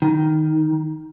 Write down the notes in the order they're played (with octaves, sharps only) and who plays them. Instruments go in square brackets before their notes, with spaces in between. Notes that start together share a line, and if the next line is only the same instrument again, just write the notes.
[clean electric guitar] D#3